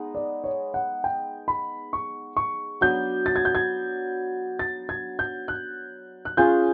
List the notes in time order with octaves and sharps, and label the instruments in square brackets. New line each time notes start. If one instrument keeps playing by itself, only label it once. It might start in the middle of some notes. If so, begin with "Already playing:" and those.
Already playing: [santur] G#3 B3 D#4
[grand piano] D5
C#5
F#5
G5
B5
C#6
C#6
[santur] F#3 B3 D4 [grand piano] G6
[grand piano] A6
G#6
G6
G#6
A6
G#6
G6
F#6
F#6
[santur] C#4 F4 G#4 [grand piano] G6